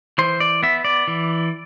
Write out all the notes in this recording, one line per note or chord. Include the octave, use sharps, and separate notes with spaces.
E3 C5
D5
B3 E5
D5
E3